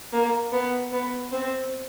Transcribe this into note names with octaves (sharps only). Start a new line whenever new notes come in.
A#3
B3
B3
C4